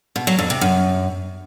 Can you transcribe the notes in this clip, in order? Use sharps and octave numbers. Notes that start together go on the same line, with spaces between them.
B2
F#3
F2
C3
F#2